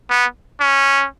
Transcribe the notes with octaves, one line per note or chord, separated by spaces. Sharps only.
B3
C#4